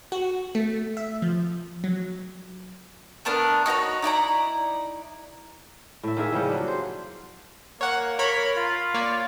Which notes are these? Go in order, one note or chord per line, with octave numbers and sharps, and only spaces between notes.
F#4
A3
E5
F3
F#3
A3 B3 D4 A#4
D#4 F#4 A4 C#5
D#4 E4 D5 A#5
A2 E5
D#3 A#3 G#4 E5
C#3 F3 G3 C#4
F#3 D4
C5
A#3 C#5 F#5
A#4 C#5 B5
F4
A#3 C#5 D5